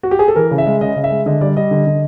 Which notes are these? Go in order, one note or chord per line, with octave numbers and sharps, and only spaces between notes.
F#4
G4
G#4
A4
E3 A#4
C#3
E5
G#3
C#3 D#5
C#3
E5
G#3
D3 D#5
G3 D5
G3 D#5
D3
D3